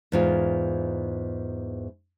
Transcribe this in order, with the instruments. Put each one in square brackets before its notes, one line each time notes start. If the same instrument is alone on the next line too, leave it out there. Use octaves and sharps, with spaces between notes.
[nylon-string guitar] E2 G#2 F4